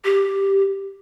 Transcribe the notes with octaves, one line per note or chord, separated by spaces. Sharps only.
G4